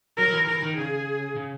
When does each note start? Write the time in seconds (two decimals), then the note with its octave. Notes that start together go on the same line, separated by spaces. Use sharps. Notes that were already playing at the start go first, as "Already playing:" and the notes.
0.17 F#3 A#4
0.28 F#3
0.33 E3
0.47 E3 A#4
0.62 D#3
0.76 C#3 G#4
1.36 C#3